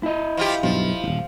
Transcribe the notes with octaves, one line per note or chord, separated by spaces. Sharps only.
E4 D#5
F3 F4 G4
B1 G2 F3
D#1 G#1